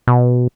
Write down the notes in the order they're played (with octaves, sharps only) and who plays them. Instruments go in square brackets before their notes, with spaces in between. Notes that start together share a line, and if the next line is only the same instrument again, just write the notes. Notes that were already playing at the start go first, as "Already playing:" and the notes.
[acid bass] B2